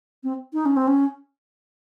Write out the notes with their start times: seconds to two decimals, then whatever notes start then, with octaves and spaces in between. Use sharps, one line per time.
0.24 C4
0.53 D#4
0.65 C#4
0.77 C4
0.88 C#4